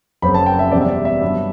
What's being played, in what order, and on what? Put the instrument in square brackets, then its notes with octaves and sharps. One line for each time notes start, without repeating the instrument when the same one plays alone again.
[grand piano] F#1 F#2 F#3 C4 B5
A5
G5
E5
E2 C3 G3 C4 D5
E5
D5
E5
G2 F#3 B3 D4